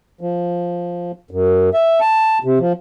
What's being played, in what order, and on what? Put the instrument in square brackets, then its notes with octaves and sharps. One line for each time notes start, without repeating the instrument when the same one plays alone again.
[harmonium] F3
F#2
E5
A5
C3
F3